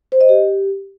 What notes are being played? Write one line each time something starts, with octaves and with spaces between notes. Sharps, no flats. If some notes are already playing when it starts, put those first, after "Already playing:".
C5
D#5
G4